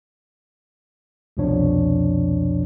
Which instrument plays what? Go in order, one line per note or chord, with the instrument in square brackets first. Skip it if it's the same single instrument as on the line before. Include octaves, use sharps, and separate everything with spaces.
[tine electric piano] C2 F2 B2 F3 D4 C#5